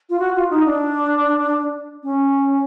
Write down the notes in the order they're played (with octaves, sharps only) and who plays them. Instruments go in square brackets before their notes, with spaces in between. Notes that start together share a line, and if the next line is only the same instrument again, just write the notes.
[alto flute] F4
F#4
F4
D#4
D4
C#4